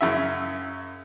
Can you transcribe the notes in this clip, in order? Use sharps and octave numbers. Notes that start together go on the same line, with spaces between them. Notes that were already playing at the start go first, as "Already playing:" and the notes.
F#2 C#3 E5